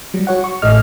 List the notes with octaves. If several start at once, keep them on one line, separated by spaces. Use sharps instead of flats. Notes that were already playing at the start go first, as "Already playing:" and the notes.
F#3 G3
F#4 C#5 F#5
C#6
A1 A2 A3 D#5 F6